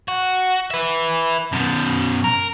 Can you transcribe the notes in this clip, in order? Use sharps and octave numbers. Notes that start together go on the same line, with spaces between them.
F#4
B4 E5
F#2 B2
A#4